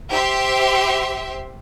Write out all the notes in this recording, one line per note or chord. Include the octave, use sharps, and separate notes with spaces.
G4 C5 E5 C6